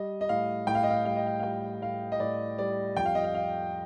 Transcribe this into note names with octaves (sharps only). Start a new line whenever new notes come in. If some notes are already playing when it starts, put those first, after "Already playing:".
Already playing: G3 D#5
D#5
A2 F5
A2 G5
F5
D#5
F5
G3 F5
D#5
F5
F5
G3 G5
A2 F5
D#5
A2 D5
G3 D5
F2 G5
F5
D#5
F5
F5